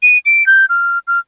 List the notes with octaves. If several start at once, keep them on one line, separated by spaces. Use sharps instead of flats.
D#7
D7
G6
F6
F6